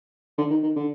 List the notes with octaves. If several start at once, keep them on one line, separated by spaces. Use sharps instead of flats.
D3
D#3
D#3
D3